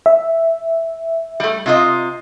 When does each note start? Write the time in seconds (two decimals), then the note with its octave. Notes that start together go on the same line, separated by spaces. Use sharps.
0.06 E5
1.40 G3 A3
1.66 C3 F4 D#5